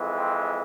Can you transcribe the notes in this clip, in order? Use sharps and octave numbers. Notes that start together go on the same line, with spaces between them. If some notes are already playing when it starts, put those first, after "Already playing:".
Already playing: F2 E3 G#3
C4